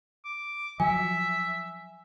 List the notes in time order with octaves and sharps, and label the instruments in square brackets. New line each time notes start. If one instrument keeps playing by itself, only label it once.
[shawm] D6
[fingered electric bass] F3 F#3 [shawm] E5 [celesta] G#5